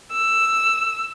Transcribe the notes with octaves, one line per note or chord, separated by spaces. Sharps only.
E6